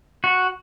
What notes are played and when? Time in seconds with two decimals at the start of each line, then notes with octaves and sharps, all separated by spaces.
0.24 F#4